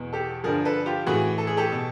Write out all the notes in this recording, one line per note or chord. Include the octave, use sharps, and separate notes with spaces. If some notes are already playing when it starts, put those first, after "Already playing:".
Already playing: E2 B2
G4 A4
G2 D3 F3 G#4 A#4
A4 B4
F4 G4
A2 E3 F#4 G#4
A4
G#4
G4 A4
B2